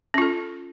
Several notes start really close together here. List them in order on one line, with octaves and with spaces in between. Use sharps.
C#4 F4 A4